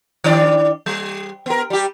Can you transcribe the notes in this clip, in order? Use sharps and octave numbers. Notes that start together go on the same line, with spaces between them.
D#3 D4 D5
G3
B3 A#4
G3 G4